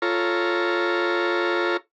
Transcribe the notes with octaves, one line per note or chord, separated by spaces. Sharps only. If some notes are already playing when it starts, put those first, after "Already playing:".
F4 A4 C#5 A#5